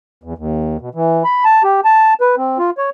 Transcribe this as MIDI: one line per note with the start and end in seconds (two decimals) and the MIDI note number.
0.23 0.34 40
0.38 0.77 39
0.81 0.89 47
0.95 1.23 52
1.24 1.44 83
1.45 1.63 81
1.64 1.81 67
1.85 2.14 81
2.21 2.35 71
2.37 2.58 60
2.58 2.70 65
2.78 2.90 73